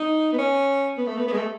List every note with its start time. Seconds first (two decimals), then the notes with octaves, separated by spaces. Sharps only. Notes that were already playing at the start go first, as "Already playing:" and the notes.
Already playing: D#4
0.32 B3
0.38 C#4
0.98 B3
1.07 A3
1.17 B3
1.27 B3
1.32 G#3
1.37 A3